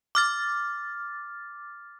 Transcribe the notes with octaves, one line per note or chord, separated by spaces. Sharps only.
D6 F6 A6